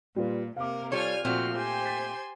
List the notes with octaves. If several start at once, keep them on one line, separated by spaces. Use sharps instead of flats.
A#2 G3 F4 B4
C3 A#3 A#4 F5 D6
G3 F4 A4 C5 C#5 G#5 F6
A#2 F3 A3 C4 F#4 F6
G4 C5 G5 G#5 C6
A6 B6